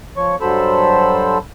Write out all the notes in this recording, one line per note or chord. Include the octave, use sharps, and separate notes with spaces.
F3 C#5 C#6
G2 F#3 A4 C5 B5 E6